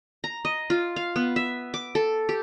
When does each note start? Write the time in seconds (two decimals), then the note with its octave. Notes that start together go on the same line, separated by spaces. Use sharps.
0.24 A#5
0.45 D#5
0.70 F4
0.96 F5
1.16 B3
1.36 E5
1.74 D6
1.95 A4
2.29 G4